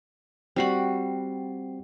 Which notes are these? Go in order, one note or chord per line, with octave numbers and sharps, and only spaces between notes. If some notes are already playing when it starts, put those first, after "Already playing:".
G3 C4 F#4 B5 C7